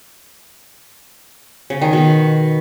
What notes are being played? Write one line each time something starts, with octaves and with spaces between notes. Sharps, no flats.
C#3
D#3
B2